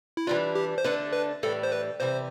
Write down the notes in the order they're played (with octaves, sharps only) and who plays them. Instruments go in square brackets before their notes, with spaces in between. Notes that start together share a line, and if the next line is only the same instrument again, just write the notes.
[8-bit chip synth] E4
[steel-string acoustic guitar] E3 G3 D4 [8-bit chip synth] F4
[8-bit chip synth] G4
C5
[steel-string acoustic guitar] D3 A3 D4 A4 [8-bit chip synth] B4
[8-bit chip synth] B4
[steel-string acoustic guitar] A2 E3 G3 D4 [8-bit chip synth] A4
[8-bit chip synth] C5
B4
[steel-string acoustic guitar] C3 E3 G3 [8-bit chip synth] C5